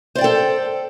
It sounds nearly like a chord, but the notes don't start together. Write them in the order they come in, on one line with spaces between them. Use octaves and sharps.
C5 D5 G5 A4